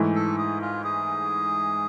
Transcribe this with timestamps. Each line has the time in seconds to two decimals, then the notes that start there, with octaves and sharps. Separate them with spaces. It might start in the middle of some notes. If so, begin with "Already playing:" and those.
Already playing: G#2 E3 A3
0.15 A4
0.38 G#4
0.61 F4
0.84 G#4